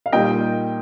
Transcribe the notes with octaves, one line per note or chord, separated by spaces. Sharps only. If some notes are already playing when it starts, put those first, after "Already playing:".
F5
A#2 G3 A#3 D#4 D#5 G5